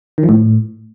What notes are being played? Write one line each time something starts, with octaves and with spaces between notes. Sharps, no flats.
D#3
F3
A2